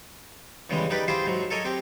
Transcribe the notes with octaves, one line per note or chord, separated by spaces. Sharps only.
E2 C#3 E3 G3 G#3 C#4
D#4 G4 B4 D5 B5
E4 F4 G4 G#4 C5
G#2 F#3
A4 A#4 C#5 D#5 G#5
C4 G4